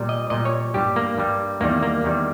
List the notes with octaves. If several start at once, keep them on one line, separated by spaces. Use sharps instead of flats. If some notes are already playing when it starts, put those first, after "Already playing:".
Already playing: A#2 G3
D#5
A#2 G3 D#5
C#5
G2 G3 G4
A#3
G2 G3
E2 D#3 G3 A#3
A#3
E2 D#3 G3